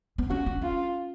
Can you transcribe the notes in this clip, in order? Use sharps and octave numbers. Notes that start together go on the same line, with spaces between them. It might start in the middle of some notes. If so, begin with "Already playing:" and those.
B3
C#4 F#4
C#4
C#4 F4